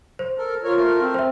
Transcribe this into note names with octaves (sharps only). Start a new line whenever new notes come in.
C5
A4 A#4
F4 A#4 C#5
A3 A#4
C4
C5 E5